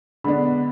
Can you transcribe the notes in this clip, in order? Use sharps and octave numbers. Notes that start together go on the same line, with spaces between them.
D3 G#3 B3 D4 B5